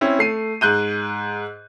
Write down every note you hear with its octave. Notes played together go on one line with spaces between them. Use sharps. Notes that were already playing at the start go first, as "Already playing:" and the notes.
C4 C#4 E4
A3 C7 D#7
G#2 F#6 G6 D#7